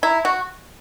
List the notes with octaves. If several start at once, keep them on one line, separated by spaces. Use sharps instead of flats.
E4 A#5
F#4 C#6